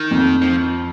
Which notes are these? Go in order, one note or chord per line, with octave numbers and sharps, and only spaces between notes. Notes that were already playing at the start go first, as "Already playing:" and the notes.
Already playing: D#3
F2
F3